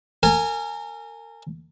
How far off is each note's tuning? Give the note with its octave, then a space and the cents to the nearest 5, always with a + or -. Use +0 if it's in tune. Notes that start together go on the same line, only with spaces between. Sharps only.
A#4 -35 G#5 +0